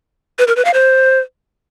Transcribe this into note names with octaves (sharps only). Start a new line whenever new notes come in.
B4
A#4
B4
F5
C5